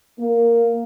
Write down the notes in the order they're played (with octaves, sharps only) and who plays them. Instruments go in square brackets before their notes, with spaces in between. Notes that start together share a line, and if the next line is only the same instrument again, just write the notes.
[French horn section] A#3